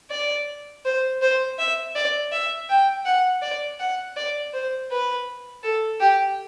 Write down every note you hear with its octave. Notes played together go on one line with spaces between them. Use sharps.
D5
C5
C5
E5
D5
E5
G5
F#5
D5
F#5
D5
C5
B4
A4
G4